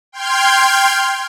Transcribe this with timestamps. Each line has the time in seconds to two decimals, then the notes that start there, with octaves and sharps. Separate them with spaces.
0.12 G5 C6 F6 G6 G#6